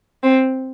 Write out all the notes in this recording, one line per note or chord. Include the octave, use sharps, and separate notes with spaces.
C4